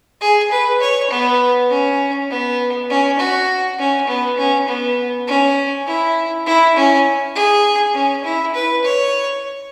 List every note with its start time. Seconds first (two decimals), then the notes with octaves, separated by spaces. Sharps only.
0.21 G#4
0.51 B4
0.81 C#5
1.10 B3
1.70 C#4
2.30 B3
2.90 C#4
3.19 F#4
3.79 C#4
4.08 B3
4.37 C#4
4.68 B3
5.27 C#4
5.86 E4
6.46 E4
6.76 C#4
7.35 G#4
7.94 C#4
8.24 E4
8.54 B4
8.84 C#5